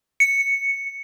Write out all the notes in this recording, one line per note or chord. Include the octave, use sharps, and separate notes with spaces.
C#7